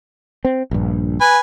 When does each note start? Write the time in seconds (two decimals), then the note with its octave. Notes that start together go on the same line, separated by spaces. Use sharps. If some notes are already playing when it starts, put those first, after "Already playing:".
0.45 C4
0.71 A#1 G2
1.21 B4 G#5